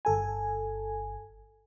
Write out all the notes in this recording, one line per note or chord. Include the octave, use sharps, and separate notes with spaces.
G1 A4 G#5